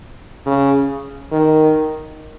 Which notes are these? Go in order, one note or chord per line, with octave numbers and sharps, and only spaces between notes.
C#3
D#3